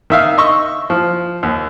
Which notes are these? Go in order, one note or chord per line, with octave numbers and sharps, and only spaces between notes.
D#3 E5 F5
D#5 C#6 E6
F3
D#2